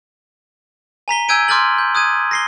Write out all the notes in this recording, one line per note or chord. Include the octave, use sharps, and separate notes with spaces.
G#5 A#5 B6 G7
G#5 E6 G6 G#6 D7 D#7
C6 D6 F6 G6 A6 F#7
G6
D#6 F#6 G#6 D#7
A#6 C7 G7